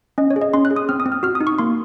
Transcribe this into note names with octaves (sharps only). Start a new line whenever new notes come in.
C#4 D#5
C#5
G#4
D#5
C#4 C6
F#6
G#4
D#6
C4 F6
D#6
C4
F6
F#4 F6
D#6
D#4
C#6
A#3 C6